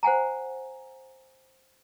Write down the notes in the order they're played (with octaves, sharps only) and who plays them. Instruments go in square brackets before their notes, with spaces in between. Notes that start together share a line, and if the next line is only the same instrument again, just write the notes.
[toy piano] C5 F#5 G#5 A#5